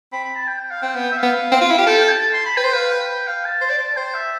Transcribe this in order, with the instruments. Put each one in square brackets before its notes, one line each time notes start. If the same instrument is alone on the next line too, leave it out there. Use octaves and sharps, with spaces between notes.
[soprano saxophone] C4 [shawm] B5
[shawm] B5
A5
G5
G5
F5
[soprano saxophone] C4 [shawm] G5
[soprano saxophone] B3
[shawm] E5
[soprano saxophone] B3 [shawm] F5
[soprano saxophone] C4
F4
E4
G4
[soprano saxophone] A4 [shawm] G5
[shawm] G5
A5
C6
B5
[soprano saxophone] B4 [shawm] G5
[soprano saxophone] C5
[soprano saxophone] B4 [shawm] F5
[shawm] G5
F5
A5
[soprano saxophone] C5
D5
C5
[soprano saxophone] C5 [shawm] G5
[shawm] E5